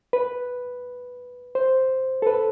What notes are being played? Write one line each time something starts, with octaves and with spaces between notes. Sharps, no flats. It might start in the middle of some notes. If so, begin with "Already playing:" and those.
B4
C5
A4
B4